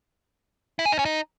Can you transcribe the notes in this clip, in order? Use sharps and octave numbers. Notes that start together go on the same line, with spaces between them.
E4
G#4
D#4
C#4
D#4